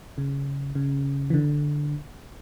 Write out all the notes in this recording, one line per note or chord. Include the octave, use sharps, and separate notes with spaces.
C#3
C#3
E3
D3